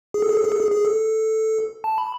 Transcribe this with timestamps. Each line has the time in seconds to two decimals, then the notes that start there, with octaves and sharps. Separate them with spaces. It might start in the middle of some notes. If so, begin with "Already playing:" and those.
0.14 G#4
0.23 A4
0.29 G#4
0.37 A4
0.44 G#4
0.52 A4
0.60 G#4
0.71 G#4
0.85 A4
1.84 A5
1.98 B5